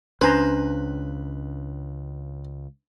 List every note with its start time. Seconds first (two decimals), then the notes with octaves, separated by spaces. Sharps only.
0.21 C#2 C#4 D4 B4 C5 G#5 A#5